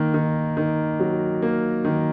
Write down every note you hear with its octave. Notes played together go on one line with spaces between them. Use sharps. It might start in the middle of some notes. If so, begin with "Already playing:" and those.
Already playing: D#3 A#3
D#3
D#3
F#3
A#3
D#3